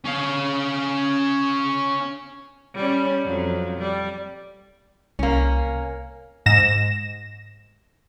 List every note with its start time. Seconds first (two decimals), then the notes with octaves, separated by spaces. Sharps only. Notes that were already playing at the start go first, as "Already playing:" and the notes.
0.06 C#4 F5
2.75 G3 C#4
3.25 F2 F#3
3.78 G3
5.19 C2 A#3 C#4
6.46 G#2 A#6 E7